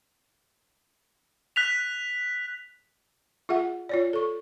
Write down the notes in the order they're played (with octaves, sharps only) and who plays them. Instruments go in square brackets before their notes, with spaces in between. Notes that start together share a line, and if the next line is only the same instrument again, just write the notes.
[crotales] F#6 B6 F7
[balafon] F4 G#4 E5 F#5
F4 C#5 D5
A4 C#6